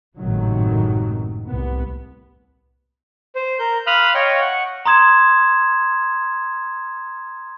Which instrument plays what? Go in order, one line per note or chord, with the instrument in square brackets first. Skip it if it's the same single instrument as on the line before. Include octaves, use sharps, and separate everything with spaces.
[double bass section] G#1 F#2 A2 C3 D#3 F#3
C2 B3
[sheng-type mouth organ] C5
A#4 G6
F5 B5 C6 D#6 F6 F#6
C#5 D#5 F5 G5 C6 C#6
F#5 C#6
[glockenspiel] A#5 C6 D#6 G#6 E7